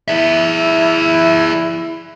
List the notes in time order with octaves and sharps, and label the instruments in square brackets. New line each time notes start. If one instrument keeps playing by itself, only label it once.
[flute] E4 [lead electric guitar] G#4 E5